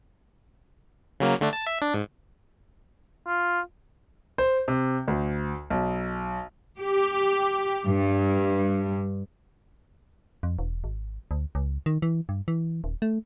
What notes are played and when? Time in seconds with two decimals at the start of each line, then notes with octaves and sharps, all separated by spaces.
1.20 C#3 F#3 A#3
1.41 D3 A3 D4
1.53 A5
1.67 E5
1.82 D4
1.94 G#2
3.27 F4
4.38 C5
4.68 C3
5.08 D2
5.70 B1
6.80 G4
7.86 G2
10.43 F2
10.59 E1
10.84 G#1
11.31 D2
11.55 C#2
11.86 D#3
12.02 E3
12.29 G2
12.48 E3
12.84 D#1
13.02 A3